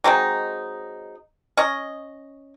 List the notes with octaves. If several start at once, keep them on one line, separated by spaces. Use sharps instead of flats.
F#3 G#3 C4 D#4
C#4 D#5